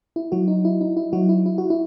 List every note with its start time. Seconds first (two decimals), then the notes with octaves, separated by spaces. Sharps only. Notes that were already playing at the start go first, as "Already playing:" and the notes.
0.16 E4
0.32 F#3 F#4
0.48 D#4
0.65 E4
0.81 D#4
0.97 E4
1.13 F#3 F#4
1.29 E4
1.46 E4
1.58 F#4
1.70 E4